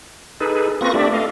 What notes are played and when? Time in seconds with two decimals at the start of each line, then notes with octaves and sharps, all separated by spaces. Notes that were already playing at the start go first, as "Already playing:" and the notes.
0.40 D#4 G#4 A4 B4
0.81 A#3 C4 F4 B4 C#6 A#6
0.94 A3 D4 G4 D5 E5
1.13 A4 D#5 F5